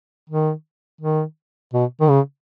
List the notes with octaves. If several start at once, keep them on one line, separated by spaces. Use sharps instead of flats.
D#3
D#3
B2
D#3
C#3